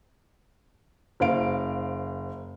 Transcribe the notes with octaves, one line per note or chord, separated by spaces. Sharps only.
F#1 C5 F5 D7